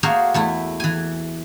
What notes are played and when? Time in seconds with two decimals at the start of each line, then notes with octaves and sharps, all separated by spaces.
0.03 A3 A#3 F#4 G#4 C5 F5
0.34 E2 A3 E4
0.80 E3 G#5